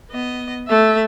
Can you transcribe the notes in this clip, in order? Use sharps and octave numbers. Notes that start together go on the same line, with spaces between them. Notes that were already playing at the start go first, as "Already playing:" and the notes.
B3 D#5
A3 E5